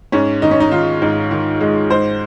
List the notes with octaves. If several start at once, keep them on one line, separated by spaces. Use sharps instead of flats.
G#2 C#4
D#3 D#4
C#4
D#4
D#3 F4
G#2
D#3
G#3
G#2 C5